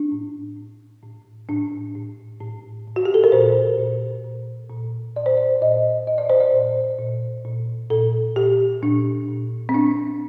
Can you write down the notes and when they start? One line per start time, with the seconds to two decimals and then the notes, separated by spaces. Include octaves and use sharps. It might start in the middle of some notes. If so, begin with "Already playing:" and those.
Already playing: D4
0.12 A2
0.57 A2
1.03 A2
1.49 A2 D4
1.95 A2
2.41 A2
2.87 A2
2.96 F#4
3.05 G4
3.14 A4
3.24 A#4
3.32 A#2 C5
3.78 A#2
4.24 A#2
4.70 A#2
5.16 A#2 D5
5.26 C5
5.37 D5
5.61 A#2 D#5
6.07 A#2 D#5
6.18 D5
6.30 C5
6.40 D5
6.53 A#2
6.99 A#2
7.45 A#2
7.90 A#2 A4
8.36 A#2 G4
8.83 A#2 D4
9.29 A#2
9.69 C4
9.74 A#2 D4